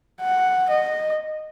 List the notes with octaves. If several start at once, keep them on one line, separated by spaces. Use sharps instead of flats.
F#5
D#5